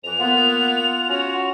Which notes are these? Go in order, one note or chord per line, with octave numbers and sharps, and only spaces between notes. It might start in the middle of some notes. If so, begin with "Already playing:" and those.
F2 E3 F7
A#3 B3 F4 F#5
C#4 F#4